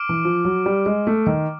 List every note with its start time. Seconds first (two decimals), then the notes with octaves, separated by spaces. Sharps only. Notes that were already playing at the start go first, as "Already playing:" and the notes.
Already playing: D6 F6 D7
0.09 E3
0.25 F3
0.45 F#3
0.66 G3
0.86 G#3
1.07 A3
1.27 D#3